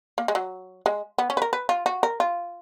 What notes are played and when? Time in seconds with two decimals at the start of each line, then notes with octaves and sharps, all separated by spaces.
0.18 A#3
0.28 G#3
0.35 F#3
0.86 G#3
1.18 B3
1.30 C#4
1.37 B4
1.42 A#4
1.53 B4
1.69 F4
1.86 F#4
2.03 A#4
2.20 F4